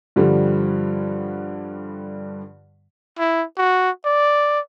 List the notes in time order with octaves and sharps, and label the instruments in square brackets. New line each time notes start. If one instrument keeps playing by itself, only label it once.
[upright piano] G2 D3 F3 G3
[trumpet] E4
F#4
D5